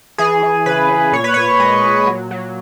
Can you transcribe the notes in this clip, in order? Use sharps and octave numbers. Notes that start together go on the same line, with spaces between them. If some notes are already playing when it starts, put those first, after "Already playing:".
E3 G#4
E3
C#3 B4
C#3
A#2 C#5
B4
A#2 C#5
G#3 D#5
A#2
F#3
F#3